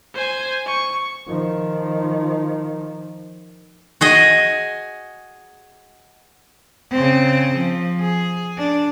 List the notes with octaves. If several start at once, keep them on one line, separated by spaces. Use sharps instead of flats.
C5 G#5
C#6
D#3 F3
F#4 G#4 D#5
C#3 C4
F3
G#4
D4